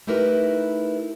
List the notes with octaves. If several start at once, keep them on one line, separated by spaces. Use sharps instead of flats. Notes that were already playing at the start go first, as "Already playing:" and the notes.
A3 D#4 E4 G4 A#4 B4